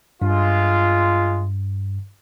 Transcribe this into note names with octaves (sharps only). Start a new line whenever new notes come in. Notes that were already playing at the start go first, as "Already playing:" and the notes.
G2 G#3 F4